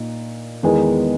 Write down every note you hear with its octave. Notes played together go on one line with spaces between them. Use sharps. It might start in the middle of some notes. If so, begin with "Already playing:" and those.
Already playing: A#2 D#4
E2 D#3 G#3 B3 D#4